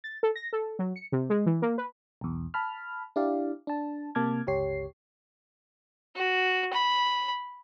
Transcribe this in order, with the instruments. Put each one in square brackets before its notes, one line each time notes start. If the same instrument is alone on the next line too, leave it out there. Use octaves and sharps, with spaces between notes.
[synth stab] A6
A4
A#6
A4
F#3
C#7
C3
G#3
E3
A#3
B4
[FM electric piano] B1 E2
A5 B5 F6
D4 E4 G4 D5 F5
D4 A5
C3 A#3 A5 D6 F6 G#6
G1 C#2 G4 C#5 C7
[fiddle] F#4
B5